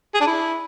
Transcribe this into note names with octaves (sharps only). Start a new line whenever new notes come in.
G#4
D4
E4